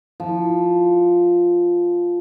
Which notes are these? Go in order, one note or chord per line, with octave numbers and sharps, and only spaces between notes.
F3